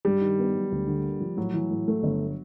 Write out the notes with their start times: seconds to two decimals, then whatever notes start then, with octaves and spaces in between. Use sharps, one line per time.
0.05 G2 G3
0.21 D#3
0.39 B3
0.55 F#3
0.72 D2
0.87 D3
1.04 A#3
1.21 F3
1.37 A2 F#3
1.54 E3
1.70 A2
1.88 A3
2.03 G1